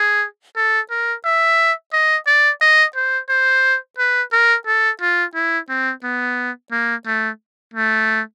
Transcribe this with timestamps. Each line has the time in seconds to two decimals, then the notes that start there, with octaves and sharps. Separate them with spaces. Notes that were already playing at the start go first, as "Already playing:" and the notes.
Already playing: G#4
0.56 A4
0.91 A#4
1.25 E5
1.93 D#5
2.27 D5
2.61 D#5
2.95 C5
3.29 C5
3.98 B4
4.32 A#4
4.67 A4
5.01 F4
5.35 E4
5.69 C4
6.03 B3
6.72 A#3
7.06 A3
7.74 A3